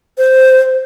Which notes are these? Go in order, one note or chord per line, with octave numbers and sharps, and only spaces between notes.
C5